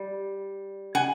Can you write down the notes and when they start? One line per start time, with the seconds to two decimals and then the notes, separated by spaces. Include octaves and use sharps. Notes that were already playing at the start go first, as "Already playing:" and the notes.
Already playing: G3
0.95 F#5 G#5